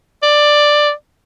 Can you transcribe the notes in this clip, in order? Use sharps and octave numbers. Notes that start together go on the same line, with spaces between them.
D5